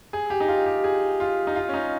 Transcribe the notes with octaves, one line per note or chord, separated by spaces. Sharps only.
G#4
G4
D#4
F4
G4
G#4
F4
D#4
F4
C#4
D#4